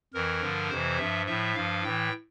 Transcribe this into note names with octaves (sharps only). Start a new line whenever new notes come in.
F2 E3 A#4
G2 D3 F3
F2 C3 E3 C5
G2 F3 E5
A2 F3 E5
G2 F3 F5
A2 E3 G5